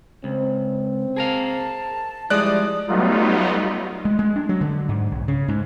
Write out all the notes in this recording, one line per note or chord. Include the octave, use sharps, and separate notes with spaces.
C#2 C4
G#4 A#4 F5 A5
F3 G3 G#3 E4 D5 D#6 F#6
F#3 G3 A3 B3 D#4 F4
G#3
G#3
D4
F#3
D3
G#2
B1
C#3
G#2